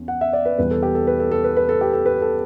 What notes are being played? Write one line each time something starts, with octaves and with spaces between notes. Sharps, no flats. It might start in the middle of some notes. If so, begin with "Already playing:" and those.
Already playing: E2 C#4
F#5
E5
D5
B4
E2 B2 G3 B4
A4
G4
A4
B4
A4
A4
B4
B4
A4
G4
A4
B4
A4